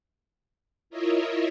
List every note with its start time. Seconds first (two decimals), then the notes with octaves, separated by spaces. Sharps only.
0.90 E4 F4 A#4 C#5 D#5 E5